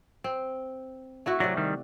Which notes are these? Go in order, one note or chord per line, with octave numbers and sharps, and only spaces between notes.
C4
A3 E4 F#4
C3 F#3 C5 D5
D#3 G3